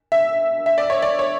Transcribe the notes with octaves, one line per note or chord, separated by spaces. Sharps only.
E5
E5
D5
C#5
D5
C#5